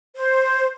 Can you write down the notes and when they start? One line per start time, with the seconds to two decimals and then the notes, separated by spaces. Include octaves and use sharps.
0.15 C5